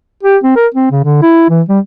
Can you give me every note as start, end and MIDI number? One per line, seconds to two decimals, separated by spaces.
0.23 0.37 67
0.43 0.54 60
0.56 0.67 70
0.75 0.89 60
0.91 1.02 49
1.04 1.18 50
1.22 1.48 64
1.50 1.62 52
1.69 1.79 55